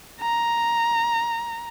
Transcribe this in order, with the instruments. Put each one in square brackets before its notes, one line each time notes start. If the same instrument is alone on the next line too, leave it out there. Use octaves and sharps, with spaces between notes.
[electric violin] A#5